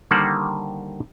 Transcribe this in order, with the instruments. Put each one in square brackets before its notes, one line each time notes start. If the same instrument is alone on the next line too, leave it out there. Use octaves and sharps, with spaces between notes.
[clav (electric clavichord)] D3 D#3 G3 A#3 C5 F#5